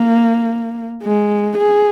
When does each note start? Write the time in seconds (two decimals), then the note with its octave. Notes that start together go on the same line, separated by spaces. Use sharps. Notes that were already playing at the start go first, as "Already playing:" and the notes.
Already playing: A#3
1.03 G#3
1.58 G#4